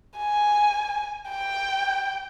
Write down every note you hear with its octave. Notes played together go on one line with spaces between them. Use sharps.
G#5
G5